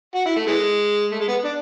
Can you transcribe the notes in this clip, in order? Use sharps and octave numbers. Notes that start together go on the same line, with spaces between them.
F#4
E4
A3
E3 G#3
A3
G#3
B3
D4